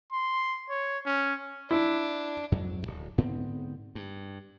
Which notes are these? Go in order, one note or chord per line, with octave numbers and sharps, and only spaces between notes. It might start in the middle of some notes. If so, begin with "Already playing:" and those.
C6
C#5
C#4
D4 E4
F2 G#2 F#3
D1 F2
G#2 D3 B3 C4
G2